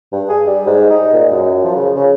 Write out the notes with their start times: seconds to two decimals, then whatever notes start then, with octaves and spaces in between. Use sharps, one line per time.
0.13 G2
0.29 G#4
0.47 G3
0.67 G#2
0.90 D#4
1.13 A#2
1.31 F#2
1.64 F3
1.76 C#3
1.96 C#3